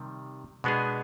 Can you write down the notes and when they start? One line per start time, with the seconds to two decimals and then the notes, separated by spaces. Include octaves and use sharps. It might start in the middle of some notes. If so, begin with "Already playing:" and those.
Already playing: C3 D#3 G3
0.64 B2 G#3 B3 D4 G#4